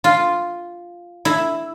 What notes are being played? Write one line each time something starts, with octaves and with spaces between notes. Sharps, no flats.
F4
E4